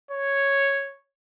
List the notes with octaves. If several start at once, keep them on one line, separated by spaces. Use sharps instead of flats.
C#5